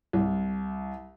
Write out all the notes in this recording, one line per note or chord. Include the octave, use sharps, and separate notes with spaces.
C2